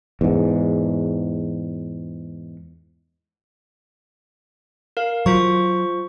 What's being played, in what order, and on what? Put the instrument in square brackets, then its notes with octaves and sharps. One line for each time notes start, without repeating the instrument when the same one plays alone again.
[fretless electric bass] E2 G#2
[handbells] A#4 F5
[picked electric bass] F#3 [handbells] F4 C5 C#6